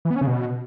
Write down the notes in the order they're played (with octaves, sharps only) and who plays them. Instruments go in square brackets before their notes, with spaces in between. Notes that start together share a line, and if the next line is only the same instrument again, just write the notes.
[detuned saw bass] E3
B3
C#4
C#3
B2